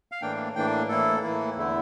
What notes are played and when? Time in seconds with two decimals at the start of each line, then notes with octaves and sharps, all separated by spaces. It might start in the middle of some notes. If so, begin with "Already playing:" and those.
0.12 F5
0.22 A2 E3 A#3 D4 G5
0.55 A2 E3 A#3 D4 G5
0.89 A2 E3 A#3 E4 A4
1.23 A2 E3 A#3 E4
1.56 E2 D3 A3 E4